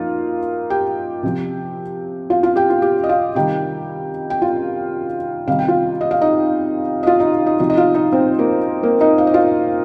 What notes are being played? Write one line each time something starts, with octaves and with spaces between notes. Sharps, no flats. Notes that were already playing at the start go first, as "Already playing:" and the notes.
Already playing: F3 A#3 D#4 F4 F5
G4 G5
C3 F3
F4 F5
F4 F5
G4 G5
F4
G4
D#5
F4 F5
C3 D#3 G3 G4 G5
G5
F4 F5
C3 D#3 G3 F5
G5
F4 F5
D#5
F5
D#4 D#5
D#5
F4 F5
D#4 D#5
D#4 D#5
C3 F3 D#4 D#5
D#5
F4 F5
D#4 D#5
C4 C5
A#3 A#4
A#3 A#4
D#4 D#5
F5
D#5
F4 F5